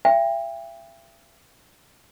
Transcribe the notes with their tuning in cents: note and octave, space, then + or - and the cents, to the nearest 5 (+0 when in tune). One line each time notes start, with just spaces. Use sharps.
E5 +40 G5 +30